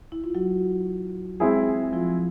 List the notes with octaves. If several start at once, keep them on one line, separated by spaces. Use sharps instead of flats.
E4
F4
F#3 F#4
G#3 C4 E4 G#4
F3 F4